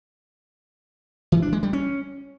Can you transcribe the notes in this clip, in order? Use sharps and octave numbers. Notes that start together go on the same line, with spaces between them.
E3
D4
G#3
G3
C#4